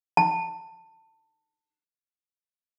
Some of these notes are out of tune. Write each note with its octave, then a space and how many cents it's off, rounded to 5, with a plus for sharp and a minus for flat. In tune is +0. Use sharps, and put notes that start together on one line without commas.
A5 +20